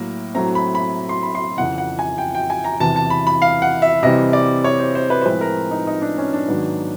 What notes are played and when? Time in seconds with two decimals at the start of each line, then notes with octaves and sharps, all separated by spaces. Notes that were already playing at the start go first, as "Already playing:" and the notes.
Already playing: A2 F#3 A#3
0.34 A2 F#3 A3 C4 A#5
0.55 B5
0.75 B5
1.09 C6
1.23 B5
1.35 C6
1.57 F2 C#3 E3 F#5
1.78 F#5
1.99 G#5
2.18 G5
2.35 G5
2.50 G#5
2.64 A#5
2.80 E2 C3 E3 A5
2.96 A5
3.10 B5
3.27 B5
3.42 F5
3.62 F#5
3.82 E5
4.03 C3 E3 G3 C4 D#5
4.33 D5
4.64 C#5
4.80 C5
4.95 C5
5.10 B4
5.22 C5
5.25 A2 F3 G#3 C4 B4
5.41 A#4
5.71 D#4
5.87 D#4
6.02 D4
6.18 C#4
6.33 D4
6.48 G#2 D#3 F#3 B3